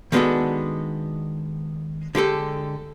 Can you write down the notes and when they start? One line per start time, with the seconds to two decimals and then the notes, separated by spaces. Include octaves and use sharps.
0.12 D#3 G#3 B3 D4 F#4 A4
2.15 D3 G#3 G4 A4